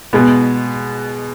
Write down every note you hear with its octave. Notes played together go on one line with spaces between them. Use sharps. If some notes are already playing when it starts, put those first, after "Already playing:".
B2 G#3 B3